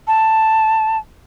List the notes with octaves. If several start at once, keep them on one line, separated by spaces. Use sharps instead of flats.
A5